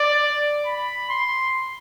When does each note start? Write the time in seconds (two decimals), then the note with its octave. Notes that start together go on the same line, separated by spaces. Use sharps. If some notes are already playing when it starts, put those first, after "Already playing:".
Already playing: D5
0.66 B5
1.09 C6